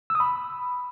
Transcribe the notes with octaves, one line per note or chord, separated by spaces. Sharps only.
E6
D#6
B5